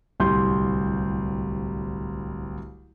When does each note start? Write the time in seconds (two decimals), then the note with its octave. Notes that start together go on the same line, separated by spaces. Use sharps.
0.20 D1 C2 G3 C6 G6